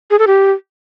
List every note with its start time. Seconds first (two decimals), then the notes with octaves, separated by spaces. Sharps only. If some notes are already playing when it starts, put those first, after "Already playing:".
0.11 G#4
0.19 A4
0.27 G4